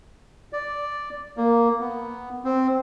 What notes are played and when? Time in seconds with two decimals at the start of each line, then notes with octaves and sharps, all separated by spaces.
0.53 D5
1.37 A#3
1.80 B3
2.44 C4